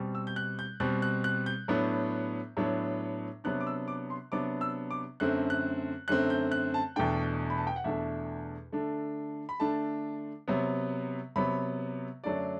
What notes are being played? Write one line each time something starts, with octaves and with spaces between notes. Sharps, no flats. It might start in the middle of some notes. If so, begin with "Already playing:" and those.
Already playing: B2 G3 C4
E6
G6
F#6
G6
B2 G3 C4 F#6
F#6
F#6
G6
A2 F#3 B3 D4
A2 F#3 B3 D4
C3 F#3 B3 D4 F#6
D6
E6
D6
C6
C3 F#3 B3 D4 D6
E6
D6
F#2 D3 A3 C4 F#6
F#6
F#2 D3 A3 C4 F#6
G6
F#6
A5
E2 B2 A3 D4 G5
B5
A5
G5
F#5
E2 B2 A3 D4 E5
D3 A3 D4
B5
D3 A3 D4 A5
C3 F#3 B3
C3 F#3 B3 B5
F#2 D3 F#3 A3 D4 D5